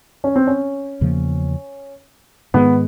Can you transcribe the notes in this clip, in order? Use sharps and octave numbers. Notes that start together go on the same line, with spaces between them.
C#4
C4
C#4
E2 C#3 F3 A#3
G#2 D#3 G#3 B3